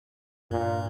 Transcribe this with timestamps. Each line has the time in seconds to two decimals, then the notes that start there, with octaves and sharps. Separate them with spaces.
0.51 G2 A#2